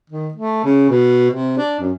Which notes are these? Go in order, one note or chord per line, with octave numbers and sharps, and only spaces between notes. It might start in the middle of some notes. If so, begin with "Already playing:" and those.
D#3
A3
C#3
B2
C3
D4
F#2